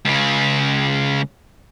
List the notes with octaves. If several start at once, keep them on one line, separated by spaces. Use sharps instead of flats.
C#2 C#3